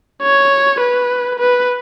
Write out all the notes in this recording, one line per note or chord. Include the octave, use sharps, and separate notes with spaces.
C#5
B4
B4